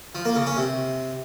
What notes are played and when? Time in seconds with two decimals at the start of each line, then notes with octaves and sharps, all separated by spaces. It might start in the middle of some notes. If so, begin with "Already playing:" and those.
0.15 F3
0.25 A#3
0.36 C#3
0.46 C#4
0.57 C3